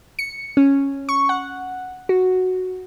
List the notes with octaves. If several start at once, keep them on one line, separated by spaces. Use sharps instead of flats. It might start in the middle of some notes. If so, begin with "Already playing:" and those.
C#7
C#4
C#6
F#5
F#4